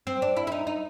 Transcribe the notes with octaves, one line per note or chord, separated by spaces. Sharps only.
C4
D4
E4
E4
D#4
D#4